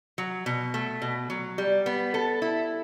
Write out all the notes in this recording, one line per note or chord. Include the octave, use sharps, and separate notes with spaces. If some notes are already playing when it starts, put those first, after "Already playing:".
F#3
B2
A3
B2
F#3
G3
B3
A4
E4